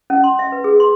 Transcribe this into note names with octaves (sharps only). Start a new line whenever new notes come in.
C#4
C6
E5
B4
G#4
C6